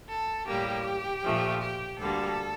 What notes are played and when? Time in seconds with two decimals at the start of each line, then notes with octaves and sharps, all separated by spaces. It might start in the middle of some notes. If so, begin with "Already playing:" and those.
0.09 A4
0.47 A2 G3 A#3 G4
1.24 A#2 F3 A3
1.60 G4
1.98 D2 D3 G3 A#3 A4